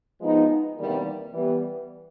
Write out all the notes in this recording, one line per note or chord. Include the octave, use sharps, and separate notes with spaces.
F3 G#3 B3 D#4
E2 C3 D#3 G3 A#3
E3 G3 B3